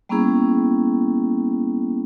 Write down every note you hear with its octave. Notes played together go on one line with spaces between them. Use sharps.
G3 A#3 B3 C#4 E4 G#4